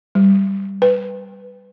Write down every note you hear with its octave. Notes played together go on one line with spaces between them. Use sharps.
G3
B4